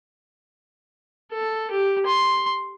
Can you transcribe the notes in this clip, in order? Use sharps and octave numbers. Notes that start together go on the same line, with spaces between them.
A4
G4
C6